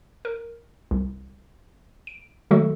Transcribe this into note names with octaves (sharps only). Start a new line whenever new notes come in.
A#4
C2
D7
D#3 F#3 G#3 A3 F#4 A4